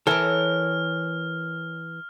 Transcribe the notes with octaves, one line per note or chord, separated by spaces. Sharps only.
E3 A4 A#4 C#5 F6